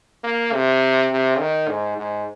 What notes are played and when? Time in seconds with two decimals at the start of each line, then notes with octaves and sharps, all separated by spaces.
0.24 A#3
0.53 C3
1.11 C3
1.39 D#3
1.68 G#2
1.97 G#2